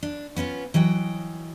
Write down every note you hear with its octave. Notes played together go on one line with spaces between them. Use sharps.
D4
B3 C#4 D#4 F4
E3 F#3 D#5 G5